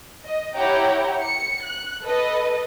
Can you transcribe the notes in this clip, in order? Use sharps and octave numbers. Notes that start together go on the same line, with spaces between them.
D#5
E4 G4 C#5 F#5 G5 A#5
C#7
F#6
A4 B4 D#5